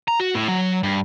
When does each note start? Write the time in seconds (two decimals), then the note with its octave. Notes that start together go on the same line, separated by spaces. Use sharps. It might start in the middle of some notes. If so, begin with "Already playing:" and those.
0.08 A#5
0.20 F#4
0.34 A2
0.48 F#3
0.83 G2